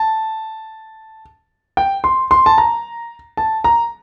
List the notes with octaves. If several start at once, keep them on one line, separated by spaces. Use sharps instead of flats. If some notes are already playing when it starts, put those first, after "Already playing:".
Already playing: A5
G5
C6
C6
A5
A#5
A5
A#5